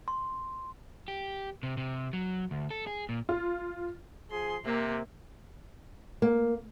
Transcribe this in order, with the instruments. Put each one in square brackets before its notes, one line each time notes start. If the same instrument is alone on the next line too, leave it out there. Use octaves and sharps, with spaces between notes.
[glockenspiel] C6
[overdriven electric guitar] G4
C3
C3
F#3
D2
A4
G#4
A#2
[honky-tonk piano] F4
[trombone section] F3 G#4 [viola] C6
[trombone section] C3 [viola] A#3
[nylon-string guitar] A#3